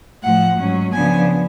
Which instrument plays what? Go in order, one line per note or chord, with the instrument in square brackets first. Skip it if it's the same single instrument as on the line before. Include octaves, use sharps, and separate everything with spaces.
[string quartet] A2 F3 A3 F#5
G#2 F#3 C#4
C#3 F3 B3 D4 G#5